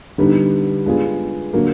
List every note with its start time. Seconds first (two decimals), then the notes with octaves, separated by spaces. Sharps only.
0.18 D3 G3 B3 D#4
0.86 G#3 B3 D4 F4 G#4
1.53 D3 F#3 A#3